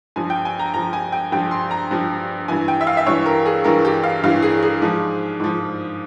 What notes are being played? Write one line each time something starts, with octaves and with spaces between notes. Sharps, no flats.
G2 F3 G#5
G5
G#5
A#5
G2 F3 A#5
G#5
G5
G2 F3 G5
C6
A#5
G2 F3
G2 E3 G#5
G5
E5
F5
E5
G2 E3 C#5
A#4
G#4
G2 E3 A#4
G4
F5
G2 E3 F5
G#4
G#4
G#2 F3
G#2 F3